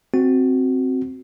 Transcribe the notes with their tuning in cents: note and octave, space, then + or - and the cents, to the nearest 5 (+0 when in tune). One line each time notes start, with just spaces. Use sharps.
C4 +0 F#4 +0